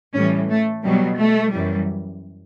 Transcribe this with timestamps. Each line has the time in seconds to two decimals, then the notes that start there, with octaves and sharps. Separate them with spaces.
0.14 A2 E3 G3 C#4
0.49 A3
0.83 B2 F#3 G3
1.17 A3
1.52 F#2 E3 G3